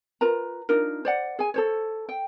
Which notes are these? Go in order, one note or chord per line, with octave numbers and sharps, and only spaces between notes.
F4 A#4 B4 A#5
D4 D#4 F4 A#4
C5 D5 F#5
G#4 G#5
A4 C5 C#5
G5